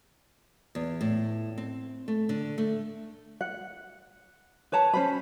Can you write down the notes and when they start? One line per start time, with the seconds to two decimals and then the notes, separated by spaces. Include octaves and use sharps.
0.75 E2
1.01 A2
1.58 C4
2.08 A3
2.29 D3
2.58 A3
3.41 F#5
4.72 B4 C#5 A5 A#5
4.93 C#4 C5 B5